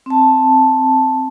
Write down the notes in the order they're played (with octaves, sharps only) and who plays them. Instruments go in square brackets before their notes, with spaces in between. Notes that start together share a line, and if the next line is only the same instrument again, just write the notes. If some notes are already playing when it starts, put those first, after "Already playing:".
[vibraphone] C4 A5